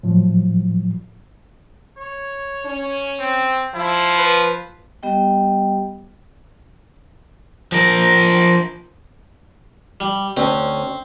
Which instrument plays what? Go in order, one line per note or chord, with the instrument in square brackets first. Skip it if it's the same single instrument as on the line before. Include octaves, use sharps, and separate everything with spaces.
[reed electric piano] A2 F3 F#3
[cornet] C#5
[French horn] C#4
[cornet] C4
[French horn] F3 [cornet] E4
[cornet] B4
[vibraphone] G3 B3 G4 D#5 G5
[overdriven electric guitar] F3 A#4
[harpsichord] G3
[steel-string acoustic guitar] D2 C#4 [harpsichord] C4